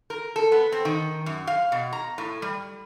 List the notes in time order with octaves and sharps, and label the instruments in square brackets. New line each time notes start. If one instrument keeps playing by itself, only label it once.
[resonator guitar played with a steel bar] A#4
A4
B3
C4
D#3
F#2
F5
B2
A#5
A2
G3